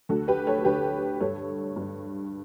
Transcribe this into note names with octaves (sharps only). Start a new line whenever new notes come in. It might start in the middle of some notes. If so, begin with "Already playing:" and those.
D2 D3 F#4 A4
G4 B4
A4 C#5
D2 D3 G4 B4
G2 D3 A4 C#5
G2 D3